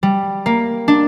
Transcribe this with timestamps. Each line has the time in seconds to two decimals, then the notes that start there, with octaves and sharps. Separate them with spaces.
0.03 G3
0.46 A#3
0.88 D4